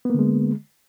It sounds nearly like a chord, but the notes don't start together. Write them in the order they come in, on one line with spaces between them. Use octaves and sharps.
B3 A#3 D3 G#3